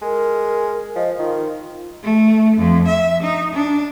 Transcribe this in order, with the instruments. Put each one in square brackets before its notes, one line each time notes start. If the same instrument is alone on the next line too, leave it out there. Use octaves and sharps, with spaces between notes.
[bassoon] G#3 [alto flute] A#4
[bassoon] F3 [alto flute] D#5
[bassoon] D#3 [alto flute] F4
[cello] A3
F2
E5
D#4
D4